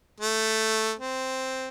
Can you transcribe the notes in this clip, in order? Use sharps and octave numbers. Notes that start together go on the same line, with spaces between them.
A3
C4